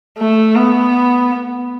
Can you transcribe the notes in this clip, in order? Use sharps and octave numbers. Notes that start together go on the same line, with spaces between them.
A3
B3